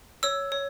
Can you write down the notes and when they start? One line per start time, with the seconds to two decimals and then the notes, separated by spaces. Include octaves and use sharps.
0.23 C#5 E6
0.52 C#5